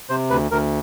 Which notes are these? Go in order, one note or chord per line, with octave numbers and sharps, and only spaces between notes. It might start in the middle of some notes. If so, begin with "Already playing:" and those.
C3 C5
D2 B4
D2 A#4